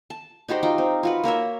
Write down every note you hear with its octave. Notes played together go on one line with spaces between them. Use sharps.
A5
D#4 F#4 G4 C5
D#4 F4 G5 A#5
C4
F4 F#4 B4
A#3 A#4 C#5 E5